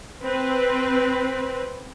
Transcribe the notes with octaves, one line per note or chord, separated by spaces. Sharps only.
C4 B4